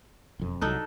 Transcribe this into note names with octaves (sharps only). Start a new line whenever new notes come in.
E1 F2
C2 F#3 D4 D#4 A4